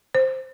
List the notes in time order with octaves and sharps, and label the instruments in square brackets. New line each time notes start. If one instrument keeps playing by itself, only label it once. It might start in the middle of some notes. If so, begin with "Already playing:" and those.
[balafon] C5